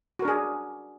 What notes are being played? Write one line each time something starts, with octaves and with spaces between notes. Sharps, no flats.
D4 F#4 G#4 A#4